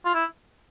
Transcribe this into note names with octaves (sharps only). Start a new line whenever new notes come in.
F4
E4